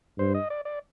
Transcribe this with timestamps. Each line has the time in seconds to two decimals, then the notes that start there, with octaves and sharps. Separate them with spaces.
0.18 G2 C5
0.34 D#5
0.50 D5
0.65 D5